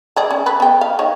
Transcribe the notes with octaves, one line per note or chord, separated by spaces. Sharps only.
G#3 G#4 D5
C#4
A4 B4
B3 G5
F5
D#3 C#5